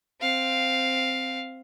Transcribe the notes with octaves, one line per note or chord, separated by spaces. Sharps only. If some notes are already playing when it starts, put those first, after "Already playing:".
C4 F5